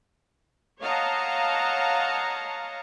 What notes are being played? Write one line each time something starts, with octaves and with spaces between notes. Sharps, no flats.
C#5 D#5 F5 F#5 A5 A#5